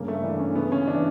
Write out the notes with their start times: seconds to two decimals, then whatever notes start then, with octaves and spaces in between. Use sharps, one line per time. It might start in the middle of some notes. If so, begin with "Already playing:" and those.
Already playing: G2 C#3 A#3
0.08 A3
0.23 E3 D4
0.39 C#4
0.55 C#3 B3
0.72 C#4
0.87 E3 D4